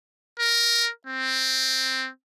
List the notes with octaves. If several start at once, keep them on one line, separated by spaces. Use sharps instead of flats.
A#4
C4